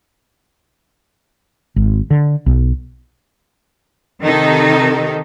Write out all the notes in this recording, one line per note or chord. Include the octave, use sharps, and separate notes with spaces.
G#1
D3
B1
C3 D#3 D#4 A4